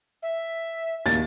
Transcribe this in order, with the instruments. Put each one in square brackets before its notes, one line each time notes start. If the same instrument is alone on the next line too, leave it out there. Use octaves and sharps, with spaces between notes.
[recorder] E5
[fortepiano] D#2 [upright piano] A6